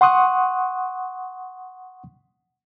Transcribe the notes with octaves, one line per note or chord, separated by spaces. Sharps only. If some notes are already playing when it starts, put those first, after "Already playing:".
F#5 C6 C#6 D#6 F#6